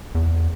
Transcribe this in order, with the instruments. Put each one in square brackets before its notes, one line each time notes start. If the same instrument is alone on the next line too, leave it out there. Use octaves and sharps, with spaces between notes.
[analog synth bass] E2